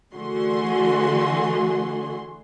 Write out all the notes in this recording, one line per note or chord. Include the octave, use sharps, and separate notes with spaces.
D3 E3 A3 F#4 G#4 C6